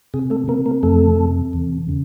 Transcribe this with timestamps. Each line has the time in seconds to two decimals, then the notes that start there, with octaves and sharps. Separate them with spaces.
0.14 C3 G#4
0.30 A3 A4
0.48 C3 A#3 A#4
0.66 A#3 A#4
0.83 F2 A3 A4
1.19 C3
1.53 E2
1.89 C#3